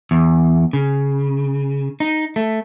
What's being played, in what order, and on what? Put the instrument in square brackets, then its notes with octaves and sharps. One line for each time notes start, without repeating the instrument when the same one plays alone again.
[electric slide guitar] E2
C#3
D#4
A3